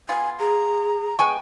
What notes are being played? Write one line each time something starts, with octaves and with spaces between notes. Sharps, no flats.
B3 F4 G#5
G#4 A#5
G#3 B3 G5 G#5 C#6